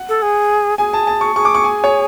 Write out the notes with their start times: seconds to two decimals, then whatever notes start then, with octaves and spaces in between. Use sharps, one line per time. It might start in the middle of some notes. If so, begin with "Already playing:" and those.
Already playing: F#5
0.09 A4
0.22 G#4
0.78 G#4 G#5
0.93 A5
1.07 A5
1.21 C#6
1.36 G#4 C#6
1.45 D6
1.55 C#6
1.64 G#5
1.84 C#5